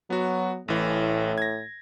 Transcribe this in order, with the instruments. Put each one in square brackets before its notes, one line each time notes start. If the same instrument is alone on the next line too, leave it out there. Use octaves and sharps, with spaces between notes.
[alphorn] F#3 [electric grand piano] B3 F#4
[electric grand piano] A1 E3 [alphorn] A2
[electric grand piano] G#6 A#6